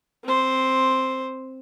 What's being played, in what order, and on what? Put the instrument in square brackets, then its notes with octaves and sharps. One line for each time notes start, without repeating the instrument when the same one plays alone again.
[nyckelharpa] C4 C5